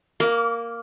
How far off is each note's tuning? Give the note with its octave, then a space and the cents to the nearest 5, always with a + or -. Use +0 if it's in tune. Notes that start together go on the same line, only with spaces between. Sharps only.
A#3 +0 D6 -35